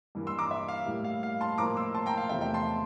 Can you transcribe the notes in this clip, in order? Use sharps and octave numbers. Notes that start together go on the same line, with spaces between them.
G2 E3 A#3
C6 E6
A#5 D6
E5
F5
A2 G3 A#3
F5
F5
A5 C6
A2 F3 A#3 A#5 D6
C6 E6
A5 C6
G5 A#5
F5
E2 C3 F3 A3 E5 G5
E5 G5
A5 C6